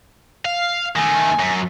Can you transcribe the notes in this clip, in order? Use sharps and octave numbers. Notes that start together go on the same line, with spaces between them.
F5
D#3 A3 G#5
F#2